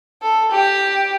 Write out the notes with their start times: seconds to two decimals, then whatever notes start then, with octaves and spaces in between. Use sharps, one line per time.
0.22 A4
0.51 G4